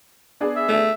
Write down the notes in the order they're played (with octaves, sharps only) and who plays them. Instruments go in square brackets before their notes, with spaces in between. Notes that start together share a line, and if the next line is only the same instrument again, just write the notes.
[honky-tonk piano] B3 D4 G#4
[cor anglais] E5
[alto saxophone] A3